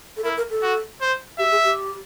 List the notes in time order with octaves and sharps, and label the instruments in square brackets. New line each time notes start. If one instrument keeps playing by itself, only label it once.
[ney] A4
[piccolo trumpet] E4 [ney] A#4
[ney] A#4
A4
[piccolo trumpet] F#4
C5
[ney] G4 [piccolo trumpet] E5
[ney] G#4
G4